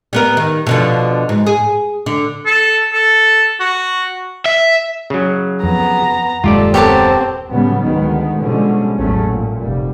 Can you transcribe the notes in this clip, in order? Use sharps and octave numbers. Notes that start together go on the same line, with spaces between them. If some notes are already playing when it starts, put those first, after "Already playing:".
G3 B3 A#4
D#3
B2 D3 F3
G#2
G#4
D3
A4
A4
F#4
E5
C#3 F#3
F2 B3 A#5
D#1 F#2 G#3 F4 G4 A4 D5
B3 C4 G4 A4 A#4 C#5 A5
A2 C#3 F#3 G3 B3
D2 D#3 G#3 B3
B2 D3 F3 G3 G#3 C#4
A1 E2 F#3 A3 C#4
A#2
F1 G3